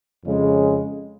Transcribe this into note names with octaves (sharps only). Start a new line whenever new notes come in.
F2 C#3 G#3 C#4